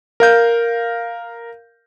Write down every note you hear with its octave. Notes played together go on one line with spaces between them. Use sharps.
A#4 F5 G6